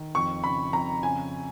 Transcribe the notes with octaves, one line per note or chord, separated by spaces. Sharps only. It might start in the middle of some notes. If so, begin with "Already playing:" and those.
Already playing: D#3
F2 C#6
C#3 B5
F2 A#5
C#3 G#5